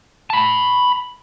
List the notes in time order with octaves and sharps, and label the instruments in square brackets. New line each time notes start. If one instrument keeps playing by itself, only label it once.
[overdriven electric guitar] A5 B5